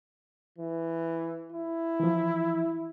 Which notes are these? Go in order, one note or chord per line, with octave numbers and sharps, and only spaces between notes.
E3
E4
E3 F3